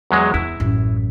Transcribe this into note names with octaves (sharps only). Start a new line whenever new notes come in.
E2 F#3 G#3
E2 E4
A1 F#2